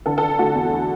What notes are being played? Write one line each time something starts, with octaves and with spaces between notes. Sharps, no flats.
D3 A4
D3 A4
A3 F#4
E2